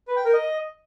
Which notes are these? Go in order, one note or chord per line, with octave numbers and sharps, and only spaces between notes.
B4
G5
A#4
D#5